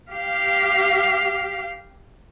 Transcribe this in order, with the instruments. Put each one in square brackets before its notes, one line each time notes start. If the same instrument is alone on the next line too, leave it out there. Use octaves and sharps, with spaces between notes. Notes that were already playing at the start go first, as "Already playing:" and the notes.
[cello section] G4 F5